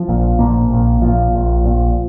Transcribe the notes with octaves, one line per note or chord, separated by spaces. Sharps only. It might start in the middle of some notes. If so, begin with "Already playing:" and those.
Already playing: F3
A#1 A#2
A#1 A#2 F3 A#3
A#1 A#2
A#1 A#2 F3
A#1 A#2
A#1 A#2